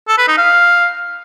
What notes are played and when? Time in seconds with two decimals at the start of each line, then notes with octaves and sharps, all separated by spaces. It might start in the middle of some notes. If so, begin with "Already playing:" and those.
0.08 A4
0.18 B4
0.28 D#4
0.38 F5